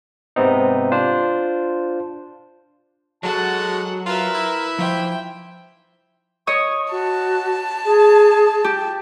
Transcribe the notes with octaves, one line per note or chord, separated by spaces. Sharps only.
G#2 C3 B3 C4 D#4
D4 F4 C5
F#3 G#3 F#4 A4 F#5 A5
F4 A#4 B4 E5
E4
F3 C5 E5 G5
C#5 D#5 C#6 D#6
F#4 A5
G#4
G4